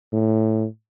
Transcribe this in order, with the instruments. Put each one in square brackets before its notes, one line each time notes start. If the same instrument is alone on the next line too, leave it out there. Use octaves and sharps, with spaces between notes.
[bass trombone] A2